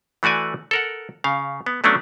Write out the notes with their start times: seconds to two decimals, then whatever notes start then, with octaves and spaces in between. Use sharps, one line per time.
0.23 E3 A3 F#4 D5 G#5
0.71 A4 A#4 F#5
1.24 C#3 F5
1.66 B3
1.84 F#3 A3 B3 C#4 D4